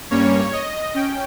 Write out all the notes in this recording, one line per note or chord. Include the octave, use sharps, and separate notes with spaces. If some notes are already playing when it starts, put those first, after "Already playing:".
G2 G3 A#3 C#4 C#5
D#5
C#4 G5